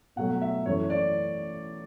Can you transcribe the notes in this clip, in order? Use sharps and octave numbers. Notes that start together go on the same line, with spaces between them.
B2 F#3 A3 F#5
E5
F#2 E3 A3 C#5
D5